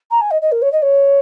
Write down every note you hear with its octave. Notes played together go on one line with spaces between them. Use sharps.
A#5
G#5
D#5
D#5
A#4
C#5
D#5
C#5